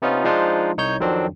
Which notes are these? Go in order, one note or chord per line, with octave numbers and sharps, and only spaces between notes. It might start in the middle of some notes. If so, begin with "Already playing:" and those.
C3 B3 C#4 D#4 F4
F3 G#3 D4 D#4 F4 C5
C2 D#4 C#5 G6
F2 D#3 F#3 C4 D4